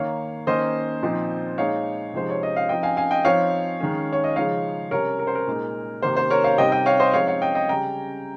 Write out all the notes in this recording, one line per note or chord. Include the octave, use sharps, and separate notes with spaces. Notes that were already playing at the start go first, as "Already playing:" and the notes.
Already playing: D#3 A#3 D#4 C#5 F5
D#3 A#3 C#4 C5 D#5
A#2 F3 C4 D#4
A#2 G#3 D#4 C#5 F5
C3 F3 G#3 D#4 C5
C#5
D#5
F5
F3 C4 D#4 D#5 G5
F5 G#5
F5 G#5
D#5 G5
F3 C4 D#4 C#5 F5
D#3 G#3 C#4
C#5
D#5
C#3 F3 G#3 D#4 C#5 F5
C3 G3 C#4 A#4 C#5
A#4
C5
A#4
A#2 G#3 D#4
C3 D#3 A#3 C5
C5
A#4 C#5
C#5 F5
C3 G3 C4 D#4 D#5 G5
D#5 G5
C#5 F5
C5 D#5
F3 G#3 C4 D#4 C#5 F5
C#5 F5
D#5 G5
D#5 G5
C#3 G3 C#4 G5 A#5